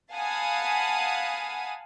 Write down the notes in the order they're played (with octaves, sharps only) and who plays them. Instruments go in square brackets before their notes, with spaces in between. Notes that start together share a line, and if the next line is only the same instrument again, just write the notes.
[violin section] F5 F#5 G#5 A5 B5 D#6